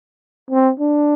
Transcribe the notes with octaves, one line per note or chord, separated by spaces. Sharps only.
C4
D4